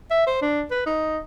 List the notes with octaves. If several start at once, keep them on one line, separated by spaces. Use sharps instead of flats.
E5
C5
D4
B4
D#4